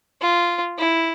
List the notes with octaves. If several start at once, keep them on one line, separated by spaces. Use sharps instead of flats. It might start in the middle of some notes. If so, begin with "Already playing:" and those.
F4
E4